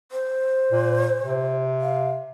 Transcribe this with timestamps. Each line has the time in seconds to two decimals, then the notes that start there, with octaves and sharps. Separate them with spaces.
0.12 C5
0.72 A#2
1.22 C3
1.81 F5